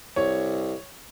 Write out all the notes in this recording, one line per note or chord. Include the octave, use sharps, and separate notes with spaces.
C2 C#5